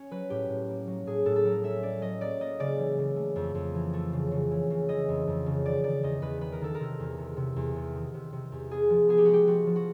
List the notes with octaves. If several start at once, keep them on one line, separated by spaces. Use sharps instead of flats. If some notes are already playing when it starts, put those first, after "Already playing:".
Already playing: C#4
F#3 B4
A2 G4
A2
A#3
F#3
A2 G#4
A2 A4
A4
F#3 A#4
C#4 E5
C#4 D5
F#3 D#5
A#3 D5
A#3 D#5
C#3 D5
E3
C#3
A3
F2
F2
E3
A3
C#3
C#3
E3
C#3
E3 D#5
F2
F2
C#3
D#3 D5
D#3 D5
E2 D#5
E2 B4
D#3 B4
A#4
D#3 A4
A#4
C3
E2
C3
C3
E2
C3
D#3
C3
C3
E2
B3 G#4
F3
B3 G#4
G4
G#3 F#4
G4
F3 F#4
F3
F#4